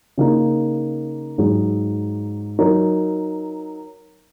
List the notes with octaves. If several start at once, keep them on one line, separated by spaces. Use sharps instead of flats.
C#3 A#3 D#4
G#2 F#3 D#4 G#4
F#3 D#4 A#4